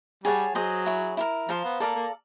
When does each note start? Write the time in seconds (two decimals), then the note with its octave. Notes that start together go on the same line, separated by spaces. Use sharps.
0.24 G3 G#4 C#5 F#5 A5
0.55 F#3 G#4 C5 D#5
0.86 E4 G#4 C#5
1.17 E4 G4 A#4
1.49 F3 C5 F5 A#5
1.65 B3
1.80 A#3 A4 D5 F5 A#5
1.96 A#3